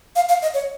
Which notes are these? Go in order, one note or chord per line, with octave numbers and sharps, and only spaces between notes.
F5
F5
D#5
C#5